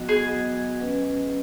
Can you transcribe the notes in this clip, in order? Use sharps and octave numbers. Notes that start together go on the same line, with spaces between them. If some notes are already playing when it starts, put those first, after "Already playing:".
Already playing: F#3 B3 F#4 D#5
G#4
F#3 B3 F#4 D#5
F#3 C#4 B4 D#5